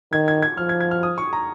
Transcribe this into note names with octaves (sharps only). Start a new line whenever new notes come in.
D#3 G#6
G#6
G#6
F3 F6
G#6
G#6
F6
D#6
C#6
A#5